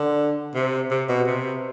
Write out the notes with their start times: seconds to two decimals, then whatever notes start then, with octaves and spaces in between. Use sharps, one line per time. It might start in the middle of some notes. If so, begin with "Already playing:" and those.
Already playing: D3
0.55 C3
0.91 C3
1.09 B2
1.27 C3